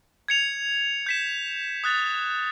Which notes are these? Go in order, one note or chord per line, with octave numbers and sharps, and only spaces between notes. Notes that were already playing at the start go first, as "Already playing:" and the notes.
G#6 C#7 F7
G6 B6 E7
D#6 F#6 A6